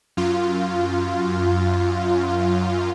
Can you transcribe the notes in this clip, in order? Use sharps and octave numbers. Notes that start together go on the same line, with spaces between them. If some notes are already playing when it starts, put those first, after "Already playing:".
F#2 F4